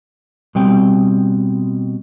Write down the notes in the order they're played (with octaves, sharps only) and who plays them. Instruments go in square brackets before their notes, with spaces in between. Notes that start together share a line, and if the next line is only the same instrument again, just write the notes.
[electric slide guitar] B2 G3 C4 G5